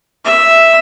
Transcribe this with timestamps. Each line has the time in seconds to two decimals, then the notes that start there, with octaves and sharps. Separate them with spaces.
0.25 E5